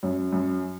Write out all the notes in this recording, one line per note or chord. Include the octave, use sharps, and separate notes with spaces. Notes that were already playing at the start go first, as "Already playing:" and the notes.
F#2
F#2